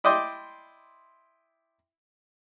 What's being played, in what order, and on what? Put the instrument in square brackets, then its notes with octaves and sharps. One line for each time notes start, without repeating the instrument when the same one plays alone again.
[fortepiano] E4 D5 D#5 G5 C6 D6